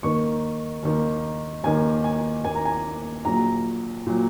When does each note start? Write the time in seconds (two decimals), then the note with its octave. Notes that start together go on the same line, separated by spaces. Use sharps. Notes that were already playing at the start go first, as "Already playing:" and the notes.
0.03 D#2 D#3 A#3 C#6
0.83 D#2 D#3 A#3
1.63 D#2 D#3 A#3 G#5
2.04 G#5
2.44 D#2 D#3 A#3 G#5
2.55 A#5
2.65 G#5
3.25 A#1 A#2 F#3 A#5
4.06 A#2 F#3